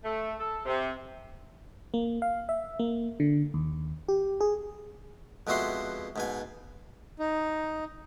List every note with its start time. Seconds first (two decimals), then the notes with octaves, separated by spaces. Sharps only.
0.04 A3
0.39 A4
0.65 C3
1.94 A#3
2.22 F5
2.49 E5
2.79 A#3
3.20 D3
3.54 D#2
4.08 G4
4.40 G#4
5.47 F2 B2 G#3 F#4 E5 C6
6.16 G#2 B2 G#5
7.19 D#4